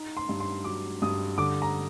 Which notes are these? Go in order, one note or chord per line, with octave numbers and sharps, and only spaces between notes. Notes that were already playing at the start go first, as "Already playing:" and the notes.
Already playing: D#4
C6
G2
C6
F#3 D6
G2 D#6
D3 D6
A#5